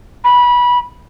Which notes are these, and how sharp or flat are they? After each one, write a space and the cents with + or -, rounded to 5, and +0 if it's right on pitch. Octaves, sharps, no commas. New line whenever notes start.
B5 -20